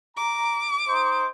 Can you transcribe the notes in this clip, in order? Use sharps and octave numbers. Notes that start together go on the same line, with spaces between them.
A#5 D6
D#4 C5